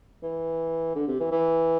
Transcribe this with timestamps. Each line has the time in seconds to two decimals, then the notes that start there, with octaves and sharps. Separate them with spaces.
0.22 E3
0.95 D3
1.08 C3
1.20 E3
1.31 E3